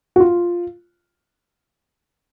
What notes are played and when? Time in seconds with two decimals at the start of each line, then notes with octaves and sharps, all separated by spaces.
0.16 F#4
0.20 F4